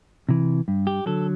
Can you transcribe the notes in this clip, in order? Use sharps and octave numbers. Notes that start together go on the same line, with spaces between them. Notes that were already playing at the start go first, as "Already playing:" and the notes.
C3 E3
G2
G4
D3 F#3 A4